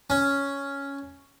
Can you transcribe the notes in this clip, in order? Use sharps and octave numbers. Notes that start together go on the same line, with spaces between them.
C#4